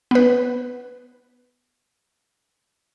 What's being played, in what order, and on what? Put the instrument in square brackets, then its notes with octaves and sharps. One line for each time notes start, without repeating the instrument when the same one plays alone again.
[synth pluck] B3 B4